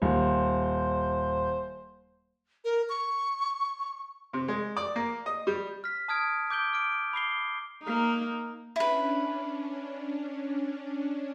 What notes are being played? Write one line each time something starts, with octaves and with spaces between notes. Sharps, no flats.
D#1 C5
A#4
C#6
C3
G#3
D5
A#3
D#5
G3
F6 B6
A5 D#6 F6 G#6 D7
D6 G6 D7 G7
F6 D7
B5 D6 C7 G7
A#3 D#4
C#4 D4 E4 B4